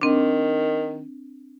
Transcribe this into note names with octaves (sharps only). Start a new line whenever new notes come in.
D#3 C4 D4